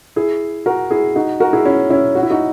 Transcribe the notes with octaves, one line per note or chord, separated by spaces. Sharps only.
E4 G#4
F#4 A#4
E4 G#4
D#4 F#4
F#4 A#4
E4 G#4
C#4 E4
C#4 E4
F#4
E4
D#4 F#4